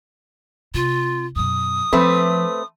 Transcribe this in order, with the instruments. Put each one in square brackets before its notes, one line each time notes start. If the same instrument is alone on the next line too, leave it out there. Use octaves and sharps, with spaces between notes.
[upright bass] C3 [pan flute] F4
[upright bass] F#2 B2 [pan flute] D#6
[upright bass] F3 [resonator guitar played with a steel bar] A3 C4 B4